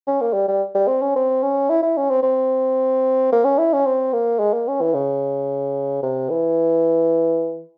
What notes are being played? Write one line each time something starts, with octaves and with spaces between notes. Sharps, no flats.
C#4
A#3
G3
G3
G3
C4
C#4
C4
C#4
E4
E4
C#4
C4
C4
A#3
C#4
E4
C#4
C4
A#3
G#3
A#3
C#4
E3
C#3
C3
E3